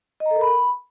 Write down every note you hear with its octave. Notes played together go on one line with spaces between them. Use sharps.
D#5
A#5
A4
A#4
B5